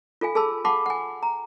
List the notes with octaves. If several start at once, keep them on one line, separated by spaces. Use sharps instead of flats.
F4 A4 F5 G#5
G#4 A4 A5 B5 E6
F5 F#5 A5 B5 C#6 D6
F#5 G#5
A#5